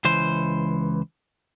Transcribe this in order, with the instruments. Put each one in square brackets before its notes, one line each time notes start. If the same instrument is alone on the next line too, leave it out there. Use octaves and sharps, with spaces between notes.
[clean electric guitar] C#2 E3 C5